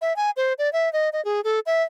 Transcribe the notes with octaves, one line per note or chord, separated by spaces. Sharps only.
E5
G#5
C5
D5
E5
D#5
D#5
G#4
A4
E5